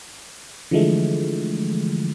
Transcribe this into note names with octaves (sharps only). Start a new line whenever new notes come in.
D3 E3 F3 G#3 A3